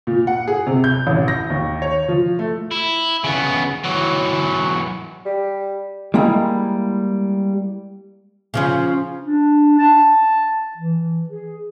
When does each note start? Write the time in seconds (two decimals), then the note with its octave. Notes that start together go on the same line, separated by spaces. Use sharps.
0.07 A#2
0.27 F#5
0.48 G#4
0.67 C3
0.84 G6
1.07 A1
1.28 A#6
1.50 D#2
1.82 C#5
2.09 F3
2.39 A3
2.71 E4
3.24 C#3 B3
3.84 E3 F#3
5.25 G3
6.14 G3 G#3 A#3 E4
8.54 C#3 F3 C#4
9.23 D4
9.78 A5
10.77 E3
11.29 G#4